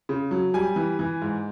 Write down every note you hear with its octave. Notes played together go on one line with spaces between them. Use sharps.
C#3
F#3
G3 G#5
E3
E3
G#2